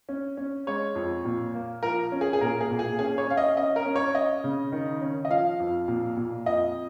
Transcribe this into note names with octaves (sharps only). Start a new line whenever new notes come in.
C#4
C#4
G#3 C#5
F2
A#2
A#3
F3 A#4
C#4
G#4
G#4
A#2 A#4
G#4
A#2
G#4
C#4 G#4
C#5
C#4 F5
D#5
C#4 D#5
A#4
C#4
C#5
C#4 D#5
C#3
D#3
C#4
D#5
F3 F5
F2
A#2
A#2
F2 D#5